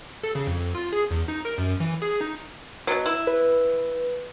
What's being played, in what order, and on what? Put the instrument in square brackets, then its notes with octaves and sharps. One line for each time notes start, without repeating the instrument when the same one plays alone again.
[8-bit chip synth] A4
C#3
F2
F4
G#4
E2
D#4
A#4
F#2
E3
G#4
D#4
[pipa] B2 F#3
E4
[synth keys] B4